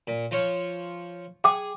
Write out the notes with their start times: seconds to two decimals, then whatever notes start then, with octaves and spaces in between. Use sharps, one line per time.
0.07 A#2
0.31 F3 F4 C#5
1.44 G#4 G5 D6